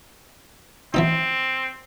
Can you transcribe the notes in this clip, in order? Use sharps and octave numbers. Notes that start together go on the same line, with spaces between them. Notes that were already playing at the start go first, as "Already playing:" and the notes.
E3 B3 C4 D#4